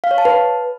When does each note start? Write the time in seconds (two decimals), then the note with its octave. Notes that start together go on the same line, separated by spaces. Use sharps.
0.04 F5
0.11 C#5
0.18 A5
0.25 B4